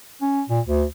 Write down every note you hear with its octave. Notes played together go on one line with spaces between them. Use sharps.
C#4
A#2
D2